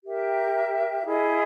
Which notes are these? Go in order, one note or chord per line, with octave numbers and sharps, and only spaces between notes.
G4 A#4 E5 G5
E4 G#4 D#5